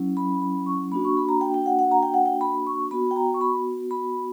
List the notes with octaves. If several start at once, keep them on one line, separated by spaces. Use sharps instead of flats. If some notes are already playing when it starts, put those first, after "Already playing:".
Already playing: F#3 C#4 E4
B5
B5
C#6
A#3 D4 F#4 B5
C#6
B5
A#5
G5
G5
F#5
F#5
A#5
G5
F#5
G5
B5
C#6
B3 F#4 B5
G5
A#5
C#6
B5
B5